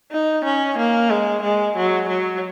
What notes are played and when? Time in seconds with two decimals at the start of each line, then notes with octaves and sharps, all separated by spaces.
0.11 D#4
0.44 C#4
0.78 A#3
1.10 G#3
1.42 G#3
1.76 F#3
2.08 F#3